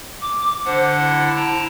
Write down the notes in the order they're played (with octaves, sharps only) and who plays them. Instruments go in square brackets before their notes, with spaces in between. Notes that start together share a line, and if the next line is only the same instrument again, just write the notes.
[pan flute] D6
[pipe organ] D3 D4 F#5 [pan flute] C5
[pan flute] E4
[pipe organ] G5 A5 A#5